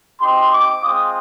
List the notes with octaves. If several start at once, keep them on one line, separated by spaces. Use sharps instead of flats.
C4 D#4 G4 C6
D6
G#3 C4 F4 D#6